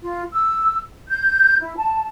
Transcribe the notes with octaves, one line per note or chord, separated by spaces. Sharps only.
F4
E6
G6
E4
A5